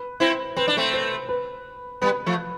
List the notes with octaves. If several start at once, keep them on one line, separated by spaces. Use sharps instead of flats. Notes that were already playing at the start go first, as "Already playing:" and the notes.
Already playing: B4
C4 E4 C5
C4 B4
D4
A3 C4
C5
B4
G3 B3 B4
F3 A3